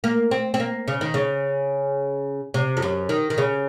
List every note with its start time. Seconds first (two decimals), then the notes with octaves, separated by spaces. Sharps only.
0.04 A#3
0.31 C4
0.54 C4
0.60 A#3
0.88 C#3
1.01 D#3
1.14 C#3
2.54 C3
2.77 F2
2.82 F#2
3.09 D#3
3.30 D#3
3.38 C#3